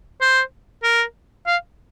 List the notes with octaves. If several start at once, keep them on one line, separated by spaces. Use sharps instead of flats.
C5
A#4
F5